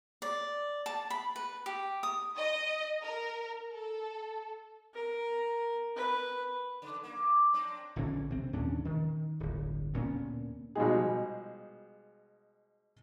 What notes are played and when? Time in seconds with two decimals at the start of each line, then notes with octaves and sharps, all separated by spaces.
0.22 D5
0.86 A5
1.10 B5
1.36 B4
1.66 G4
2.03 D#6
2.37 D#5
3.02 A#4
3.72 A4
4.94 A#4
5.96 B4
6.82 C#3
7.03 A#3
7.53 C4 D4
7.96 A#1 D3 E3 C#4
8.30 C3 C4
8.53 D#2 A#2 C#4 D4
8.85 D#3
9.40 D1 G1
9.94 D2 A#2 B3 C#4
10.75 B2 F3 G3 G#3 D#4 G#4